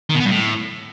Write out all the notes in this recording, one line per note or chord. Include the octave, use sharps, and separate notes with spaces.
D#3
B2
B3
G2
A2